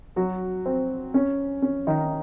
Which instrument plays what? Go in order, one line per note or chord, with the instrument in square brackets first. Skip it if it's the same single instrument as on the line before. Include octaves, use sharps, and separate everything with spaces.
[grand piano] F#3 F#4
C4
C#4
C#4
D#3 D#4